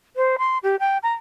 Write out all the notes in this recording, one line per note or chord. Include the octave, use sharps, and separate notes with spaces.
C5
C6
G4
G5
A#5